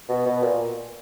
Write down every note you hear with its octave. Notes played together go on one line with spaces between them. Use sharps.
B2
B2
A#2